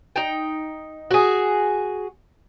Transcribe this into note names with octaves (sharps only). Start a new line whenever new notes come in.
D#4 G5
F#4 G#4